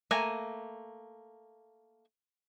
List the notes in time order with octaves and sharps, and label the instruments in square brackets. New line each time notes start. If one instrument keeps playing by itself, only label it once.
[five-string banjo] A3 A#3 G#5 A#5